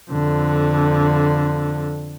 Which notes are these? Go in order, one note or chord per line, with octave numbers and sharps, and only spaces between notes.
F2 D3